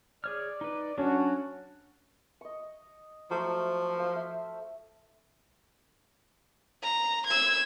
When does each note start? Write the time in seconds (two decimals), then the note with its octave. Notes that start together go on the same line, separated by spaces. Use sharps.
0.24 G#4 C#5 D5 F6
0.61 D#4 B4
0.98 F#3 C#4 D4 F#4
2.41 D#5 C#6
3.31 F3 F#3 A3
3.97 C5 F5 C#6
4.16 E5
6.83 A#5
7.27 E6 G#6